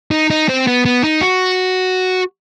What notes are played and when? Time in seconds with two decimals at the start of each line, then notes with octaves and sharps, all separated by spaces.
0.11 D#4
0.30 D#4
0.49 C4
0.67 B3
0.85 B3
1.04 D#4
1.21 F#4